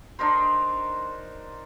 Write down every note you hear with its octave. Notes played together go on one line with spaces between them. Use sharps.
D4 D#4 A#4 C5